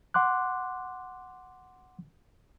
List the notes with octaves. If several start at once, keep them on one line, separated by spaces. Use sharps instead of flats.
F#5 C6 D6 F#6